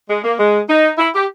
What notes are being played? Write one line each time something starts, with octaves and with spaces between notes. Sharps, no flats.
G#3
A#3
G#3
D#4
E4
G4